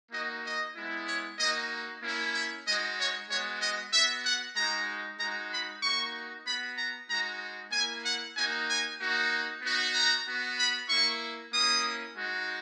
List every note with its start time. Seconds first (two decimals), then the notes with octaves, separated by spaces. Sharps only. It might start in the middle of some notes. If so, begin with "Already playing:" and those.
0.11 A#3 D#4 F#4 D#5
0.43 D#5
0.75 G#3 B3 E4
1.07 C#5
1.38 A#3 D#4 F#4 D#5
2.02 A#3 C#4 E4
2.34 E5
2.65 G#3 D#4 F#4 D#5
2.97 C#5
3.28 G#3 B3 F#4 C#5
3.60 D#5
3.91 B3 F#4 E5
4.24 F#5
4.55 G#3 D#4 F#4 A#5
5.18 G#3 D#4 F#4 A#5
5.50 B5
5.81 A#3 D#4 F#4 C#6
6.45 B3 F#4 B5
6.77 A#5
7.09 G#3 D#4 F#4 A#5
7.71 A#3 E4 G#5
8.03 F#5
8.35 A#3 D#4 F#4 G#5
8.67 G#5
8.99 A#3 D#4 F#4
9.62 B3 D#4 F#4
9.94 A#5
10.26 B3 F#4
10.57 B5
10.88 A#3 E4 C#6
11.52 A#3 C#4 E4 D#6
12.15 G#3 D#4 F#4